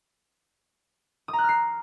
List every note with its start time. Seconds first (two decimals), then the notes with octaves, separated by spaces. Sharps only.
1.28 D#6
1.33 A#5
1.39 F#6
1.44 F6
1.49 C7